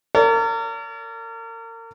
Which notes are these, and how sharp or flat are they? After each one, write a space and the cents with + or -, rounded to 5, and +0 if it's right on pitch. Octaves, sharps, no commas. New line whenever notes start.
A#4 -35 D5 -45